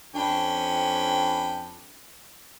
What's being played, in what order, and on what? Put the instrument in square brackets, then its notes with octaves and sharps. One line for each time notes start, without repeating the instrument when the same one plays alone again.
[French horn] F2 [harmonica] C#4 G5 B5 [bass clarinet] D4